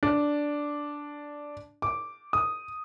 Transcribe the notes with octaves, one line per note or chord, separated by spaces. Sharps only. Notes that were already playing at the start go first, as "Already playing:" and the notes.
D4
D6
D#6